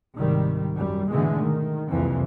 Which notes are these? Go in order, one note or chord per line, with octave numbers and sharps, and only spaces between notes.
C2 G#2 D#3 G3
F#2 G3
G#2 B2 D3 E3 G#3 A3
D#3
F#1 C2 F2 C3 E3